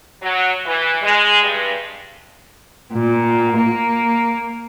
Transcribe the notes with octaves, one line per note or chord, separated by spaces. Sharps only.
F#3
E3
G#3
G2
A#2
A#3